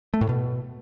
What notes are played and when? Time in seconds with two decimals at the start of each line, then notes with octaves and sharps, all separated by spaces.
0.14 A3
0.21 A2
0.29 B2